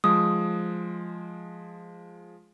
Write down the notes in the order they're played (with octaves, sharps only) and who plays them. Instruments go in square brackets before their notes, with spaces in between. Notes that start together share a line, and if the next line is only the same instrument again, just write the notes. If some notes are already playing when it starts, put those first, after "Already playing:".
[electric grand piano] F3 G#3 [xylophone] D#6